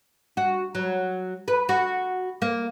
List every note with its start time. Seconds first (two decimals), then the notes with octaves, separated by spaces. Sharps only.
0.37 F#4
0.75 F#3
1.48 B4
1.69 F#4
2.42 A#3